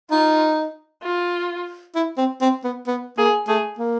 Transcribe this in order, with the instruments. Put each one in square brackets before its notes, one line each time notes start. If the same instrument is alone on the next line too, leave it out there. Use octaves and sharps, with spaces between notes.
[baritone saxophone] D#4 [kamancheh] F4
[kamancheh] F4
[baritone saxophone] E4
C4
C4
B3
B3
[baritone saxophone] A#3 [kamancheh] G#4
[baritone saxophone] A3 [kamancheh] G#4
[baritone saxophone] A#3